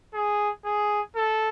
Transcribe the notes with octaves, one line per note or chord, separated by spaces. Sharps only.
G#4
G#4
A4